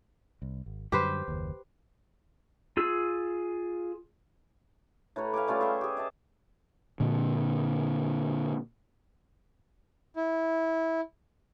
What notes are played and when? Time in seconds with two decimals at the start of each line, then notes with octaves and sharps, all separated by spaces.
0.42 C2
0.66 G#1
0.92 F#2 D3 G3 G4 B4 C5
1.28 F#1 D#2
2.77 F4 G#4 E6
5.16 A2 B4 C#5 A#5
5.33 F5 G#5 B5 D6
5.48 G3 A3 C#4 F4
5.61 G#4 E5 G5
5.81 G4 G#4
5.97 D#5 E5 A5
7.00 A#2 D3
10.16 E4